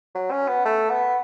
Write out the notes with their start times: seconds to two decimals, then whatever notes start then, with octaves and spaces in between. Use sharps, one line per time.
0.15 F#3
0.31 C#4
0.48 B3
0.65 A3
0.90 B3